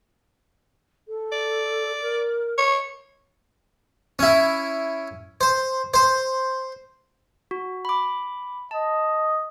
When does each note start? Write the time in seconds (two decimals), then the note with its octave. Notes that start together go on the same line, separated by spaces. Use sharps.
1.08 A4
1.32 D5
2.01 A#4
2.58 C#5
4.19 C#4 E4
5.41 C5
5.94 C5
7.51 F#4
7.85 B5 D6
8.71 D#5 A5